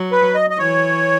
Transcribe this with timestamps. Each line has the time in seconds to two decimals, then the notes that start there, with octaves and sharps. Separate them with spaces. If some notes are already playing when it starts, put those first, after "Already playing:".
Already playing: F#3
0.12 B4
0.35 D#5
0.50 D#5
0.58 E3 C#5